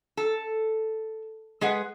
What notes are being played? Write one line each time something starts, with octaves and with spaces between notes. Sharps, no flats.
A4
G#3 G#4 B4 F#5